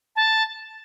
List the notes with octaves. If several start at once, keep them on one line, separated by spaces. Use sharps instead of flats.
A5